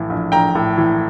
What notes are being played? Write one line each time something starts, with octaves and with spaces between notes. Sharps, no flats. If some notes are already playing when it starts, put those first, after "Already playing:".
Already playing: A#1 A2 E3
A#1
A#1 G5 A#5
A2
E3